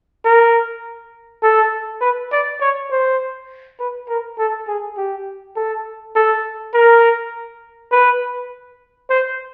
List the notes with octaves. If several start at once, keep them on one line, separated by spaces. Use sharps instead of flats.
A#4
A4
B4
D5
C#5
C5
B4
A#4
A4
G#4
G4
A4
A4
A#4
B4
C5